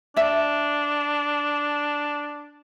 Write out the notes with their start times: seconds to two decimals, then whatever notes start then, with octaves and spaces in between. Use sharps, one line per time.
0.16 D4 D5 E5